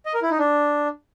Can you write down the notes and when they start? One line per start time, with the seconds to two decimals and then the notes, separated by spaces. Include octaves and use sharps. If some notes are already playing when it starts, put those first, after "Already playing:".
0.06 D#5
0.14 A#4
0.22 E4
0.30 D#4
0.39 D4